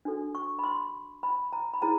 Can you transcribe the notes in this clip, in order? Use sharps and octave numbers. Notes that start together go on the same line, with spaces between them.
D4 F#4 A4
C#6
B5
C6
B5
A#5
B5
E4 G#4 C#5 A#5